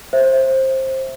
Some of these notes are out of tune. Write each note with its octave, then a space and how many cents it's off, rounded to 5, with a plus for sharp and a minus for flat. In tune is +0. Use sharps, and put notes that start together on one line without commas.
C5 +20 E5 +0